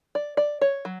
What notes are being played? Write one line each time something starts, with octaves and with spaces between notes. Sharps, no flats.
D5
D5
C#5
F#3